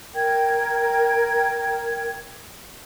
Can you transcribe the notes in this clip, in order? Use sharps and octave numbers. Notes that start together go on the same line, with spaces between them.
A#4 G5 G#6